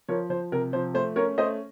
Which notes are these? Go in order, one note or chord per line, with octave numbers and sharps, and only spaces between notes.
F3 A#4 C#5
F3 C5
C3 A#4
F3 C5
A3 C5
C#4 A#4 C#5
A3 C5 D#5